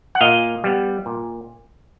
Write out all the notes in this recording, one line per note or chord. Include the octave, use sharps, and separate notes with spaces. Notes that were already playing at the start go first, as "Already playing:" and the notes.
F#5
A#2 D#5 F5
G3 B3
A#2